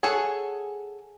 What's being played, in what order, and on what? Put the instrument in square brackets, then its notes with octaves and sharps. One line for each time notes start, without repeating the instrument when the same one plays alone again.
[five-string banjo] G#4 A4 C#5 F#5 G#5